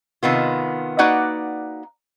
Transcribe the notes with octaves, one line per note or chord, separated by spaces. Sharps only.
C3 D#3 B3 F4
A#3 D#4 F#4 B4 D5 F#5